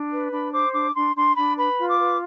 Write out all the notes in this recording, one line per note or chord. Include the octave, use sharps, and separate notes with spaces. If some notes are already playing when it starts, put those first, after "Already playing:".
Already playing: D4
B4
D4 B5
C5 D6
D4 D6
D4 C6
D4 C6
D4 B5
B4 B5
F4
D6
B4